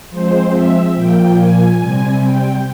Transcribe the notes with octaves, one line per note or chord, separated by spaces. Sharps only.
F3 G#3 C4 C5
E5
A#2 F3 A#3 G5
G#5
C3 G3 C4
G5